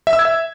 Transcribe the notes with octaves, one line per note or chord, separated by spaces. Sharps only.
E5
E6
G#6
E5